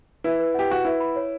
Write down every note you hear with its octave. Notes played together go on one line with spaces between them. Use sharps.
E4 B4
B4
G4 F#5
F#4 F#5
E4 B4
B5
C#5